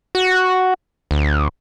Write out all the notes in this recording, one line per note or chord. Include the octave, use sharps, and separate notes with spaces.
F#4
D2